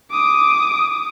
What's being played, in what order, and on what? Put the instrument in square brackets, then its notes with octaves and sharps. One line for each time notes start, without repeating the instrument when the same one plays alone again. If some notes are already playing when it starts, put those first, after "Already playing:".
[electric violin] D6 D#6